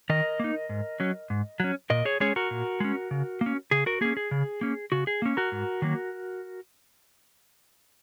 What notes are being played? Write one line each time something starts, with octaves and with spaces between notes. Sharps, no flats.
D#3 A#4 D#5
A#3 D#4
G#2
F#3 C#4
G#2
F#3 C#4
A#2 A#4 D#5
G#4 C#5
G#3 C#4 G#4 C#5
F#4 A#4
A#2
G#3 C#4
C#3
A#3
C#4
C#3 G#4
F#4 A#4
A#3 C#4 G#4
G#4
C#3
A#3 C#4
C#3 F#4
G#4
A#3 C#4
F#4 A#4
G#2
D#3 F#3 A#3